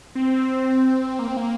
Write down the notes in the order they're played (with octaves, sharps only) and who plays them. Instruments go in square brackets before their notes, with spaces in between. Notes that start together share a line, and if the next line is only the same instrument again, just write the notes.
[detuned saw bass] C4
A#3
C4
A#3